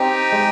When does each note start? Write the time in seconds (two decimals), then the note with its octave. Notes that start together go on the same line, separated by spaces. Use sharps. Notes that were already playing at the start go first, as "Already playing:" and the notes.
Already playing: C4 D#4 G4
0.32 G#3